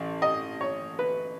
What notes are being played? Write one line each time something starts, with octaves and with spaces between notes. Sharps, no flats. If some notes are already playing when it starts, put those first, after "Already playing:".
Already playing: A1
D#5
C#5
B4